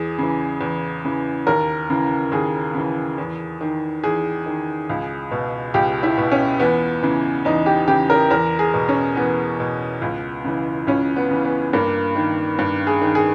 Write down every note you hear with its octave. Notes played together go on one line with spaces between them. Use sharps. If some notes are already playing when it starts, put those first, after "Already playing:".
Already playing: E2 G#4
C#3 E3
E2
C#3 E3
D#2 A#4
C#3 E3
D#2 G#4
C#3 E3
E2
D#3
E2 G#4
D#3
C#2
B2
C#2 G4
E4
B2
C#4
E2 B3
C#3 E3
E2 D#4
G4
C#3 E3 G4
A#4
E2 A#4
G#4
B2
C#4
E2 B3
B2
C#2
C#3 E3
C#2 C#4
B3
C#3 E3
B3
G2 A#3
D#3
G2
G#4
D#3
G#4